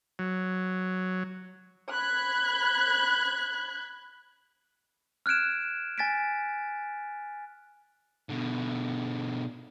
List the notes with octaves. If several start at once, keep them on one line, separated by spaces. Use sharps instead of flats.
F#3
B5 F#6 G#6
F6 F#6 G#6 D7 E7
G#5 A6 B6 D7
B2 D3